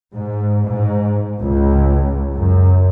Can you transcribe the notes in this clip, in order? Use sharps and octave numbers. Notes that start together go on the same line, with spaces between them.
G#2
G#2
C#2
F#2